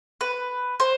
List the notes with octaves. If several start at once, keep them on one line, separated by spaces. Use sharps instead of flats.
B4
C5